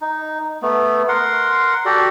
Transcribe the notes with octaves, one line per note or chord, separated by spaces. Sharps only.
D#4
A3 B3
A#4 F#5 C6
F#4 G4 A4 D5